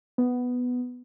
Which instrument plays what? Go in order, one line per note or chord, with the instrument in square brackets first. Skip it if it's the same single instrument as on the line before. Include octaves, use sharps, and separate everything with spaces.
[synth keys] B3